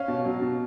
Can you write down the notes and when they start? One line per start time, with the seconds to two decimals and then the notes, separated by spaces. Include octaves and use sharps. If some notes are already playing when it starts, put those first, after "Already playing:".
Already playing: C#4 F5
0.08 B2
0.25 F#3
0.42 B2